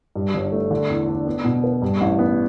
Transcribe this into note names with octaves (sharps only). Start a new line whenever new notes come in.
G2
G1
A3
D3
E2
D4
B3
B2
B4
G2
A1
B3